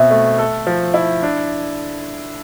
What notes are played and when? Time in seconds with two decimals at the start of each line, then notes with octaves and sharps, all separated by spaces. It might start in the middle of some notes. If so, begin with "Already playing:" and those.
Already playing: B2 C4 E5
0.10 A3
0.39 A4
0.67 F3
0.94 E4
1.23 D4